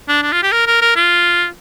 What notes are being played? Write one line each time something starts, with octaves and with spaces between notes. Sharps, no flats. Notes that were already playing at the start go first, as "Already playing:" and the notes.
D4
D4
F4
G4
A#4
A#4
A#4
F4